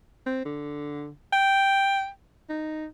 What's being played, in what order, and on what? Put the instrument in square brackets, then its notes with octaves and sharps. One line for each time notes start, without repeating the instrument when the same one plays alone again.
[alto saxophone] C4
D3
G5
D#4